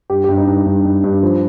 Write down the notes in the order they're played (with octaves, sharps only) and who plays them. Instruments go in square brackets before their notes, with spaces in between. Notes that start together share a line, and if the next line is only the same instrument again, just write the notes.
[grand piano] G2 G4
G2 G4
D#4
G2
G2
G2
G2
F3